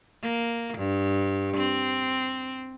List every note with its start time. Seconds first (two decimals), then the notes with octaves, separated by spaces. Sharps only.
0.23 A#3
0.78 G2
1.57 C4